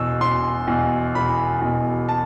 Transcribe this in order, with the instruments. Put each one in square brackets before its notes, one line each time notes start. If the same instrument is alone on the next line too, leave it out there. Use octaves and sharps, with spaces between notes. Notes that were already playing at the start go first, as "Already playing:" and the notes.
Already playing: [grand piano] E1 E2 B2 E6
E1 C6
E2 B2
E1 B5
E2 B2
A5